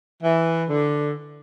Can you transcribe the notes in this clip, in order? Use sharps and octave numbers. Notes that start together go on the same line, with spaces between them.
E3
D3